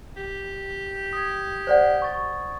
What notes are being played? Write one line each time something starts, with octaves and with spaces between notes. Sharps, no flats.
G4
D#6 G#6
C5 D5 F#5
C#6 A6